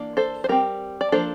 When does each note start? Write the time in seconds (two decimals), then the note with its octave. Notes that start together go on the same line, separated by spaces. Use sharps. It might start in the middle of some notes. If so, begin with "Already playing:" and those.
Already playing: E3 A#3 D4
0.17 A4 C5
0.44 C5
0.49 G3 C4 G4 A#4
1.01 D5
1.12 F3 A#3 D4 A4 C5